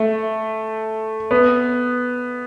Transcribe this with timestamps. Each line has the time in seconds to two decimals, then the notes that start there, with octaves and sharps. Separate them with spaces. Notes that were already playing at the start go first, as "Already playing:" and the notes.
Already playing: A3
1.31 B3